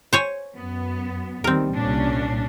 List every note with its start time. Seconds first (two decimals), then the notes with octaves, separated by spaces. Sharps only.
0.13 C5 C#5 G#5
0.57 F#2 B3
1.44 D#2 D#3 G3 C4 A#4
1.75 C2 A#2 C#4 D4